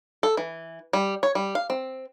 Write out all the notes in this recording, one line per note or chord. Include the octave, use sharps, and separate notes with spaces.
A4
E3
G3
C#5
G3
F5
C4